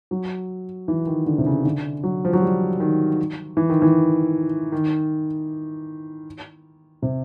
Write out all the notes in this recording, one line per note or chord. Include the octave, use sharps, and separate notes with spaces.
F#3
E3
D#3
D3
C3
C#3
D3
F#3
F3
F#3
G3
D#3
E3
D#3
E3
D#3
C3